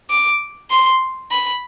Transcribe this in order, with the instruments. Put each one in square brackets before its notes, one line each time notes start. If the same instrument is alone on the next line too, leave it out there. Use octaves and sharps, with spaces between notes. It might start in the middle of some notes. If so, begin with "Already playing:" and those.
[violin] D6
C6
B5